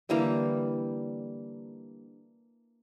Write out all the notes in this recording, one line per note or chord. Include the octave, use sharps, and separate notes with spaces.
D3 E3 G3 A#3